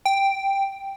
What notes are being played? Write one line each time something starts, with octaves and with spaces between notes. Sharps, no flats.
G5